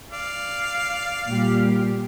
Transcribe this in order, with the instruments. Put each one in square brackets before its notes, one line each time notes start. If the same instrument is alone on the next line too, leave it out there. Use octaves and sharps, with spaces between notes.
[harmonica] D5 F5
[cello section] A#2 G3 G4